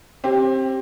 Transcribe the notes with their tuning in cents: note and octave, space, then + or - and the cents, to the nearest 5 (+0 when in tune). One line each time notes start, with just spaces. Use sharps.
C4 +20 G4 +0